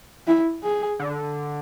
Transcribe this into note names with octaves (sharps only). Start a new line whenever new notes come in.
E4
G#4
D3